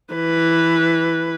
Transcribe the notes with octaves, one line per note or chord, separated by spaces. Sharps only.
E3 B4